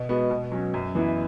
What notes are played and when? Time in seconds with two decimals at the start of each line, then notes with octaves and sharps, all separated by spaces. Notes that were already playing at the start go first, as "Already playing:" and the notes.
Already playing: B2
0.09 G#3 B3 F#4
0.30 B2
0.52 F#3 C#4
0.74 F#2
0.95 E3 B3 E4